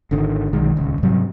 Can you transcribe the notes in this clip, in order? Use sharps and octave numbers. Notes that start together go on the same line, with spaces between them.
G#1 D3 D#3
B1 D#3 G#3
D#1 C#2
G#2 C3 F#3 G3